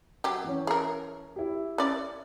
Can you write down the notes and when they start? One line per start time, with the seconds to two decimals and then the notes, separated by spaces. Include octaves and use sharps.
0.24 F#3 G4
0.44 E3 C#4
0.67 G#4 A#4
1.36 E4 G4
1.78 C#4 D5